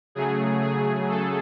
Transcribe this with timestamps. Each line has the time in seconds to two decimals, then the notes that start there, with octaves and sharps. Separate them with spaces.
0.15 C#3 F#3 A3 G#4
0.62 G#4
1.09 A4